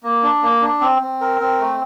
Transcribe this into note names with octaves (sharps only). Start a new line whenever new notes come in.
A#3
D4
A#3
D4
C4
C4
A#4
C4
A3